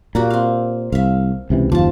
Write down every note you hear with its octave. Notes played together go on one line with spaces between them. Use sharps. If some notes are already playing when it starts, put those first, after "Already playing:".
A#2 A#3 F#4 G4
C4 F5
C2 E5 F5
C#2 C3 E3
F#1 D#2 F3 A5